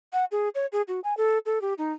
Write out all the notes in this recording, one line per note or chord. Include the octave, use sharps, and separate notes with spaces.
F#5
G#4
C#5
G#4
F#4
G#5
A4
A4
G4
D#4